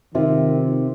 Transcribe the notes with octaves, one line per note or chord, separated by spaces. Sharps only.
C3 D#3 C4 F4